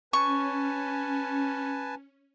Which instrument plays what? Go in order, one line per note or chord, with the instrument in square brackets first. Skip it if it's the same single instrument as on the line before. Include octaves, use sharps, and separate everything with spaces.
[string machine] C#4 [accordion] B4 G#5 A5 [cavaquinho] C#6